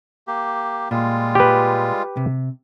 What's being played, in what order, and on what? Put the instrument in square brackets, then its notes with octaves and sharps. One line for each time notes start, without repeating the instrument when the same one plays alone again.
[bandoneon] A#3 G4
[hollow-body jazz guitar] A#2 [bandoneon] G3 G#3 F4
[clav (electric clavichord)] G4 B4
[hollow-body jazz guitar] C3